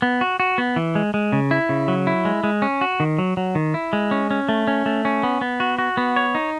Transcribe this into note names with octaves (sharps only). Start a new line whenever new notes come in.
B3
F#4
F#4
B3
E3
G#3
G#3
C#3
E4
C#3
F#3
E4
G#3
G#3
C#4
F#4
D#3
F#3
F#3
D#3
E4
G#3
C#4
C#4
A3
C#4
A3
C#4
B3
B3
F#4
F#4
B3
C#5
D#4